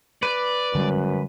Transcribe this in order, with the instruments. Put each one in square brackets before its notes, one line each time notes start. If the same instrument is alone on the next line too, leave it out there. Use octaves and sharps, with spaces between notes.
[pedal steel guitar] B4 [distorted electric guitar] D5
[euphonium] F#2 [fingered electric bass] D3 G3 G#3